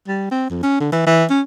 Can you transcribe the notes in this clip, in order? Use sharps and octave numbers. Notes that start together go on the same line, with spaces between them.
G3
C4
F2
C#4
D3
E3
E3
C#4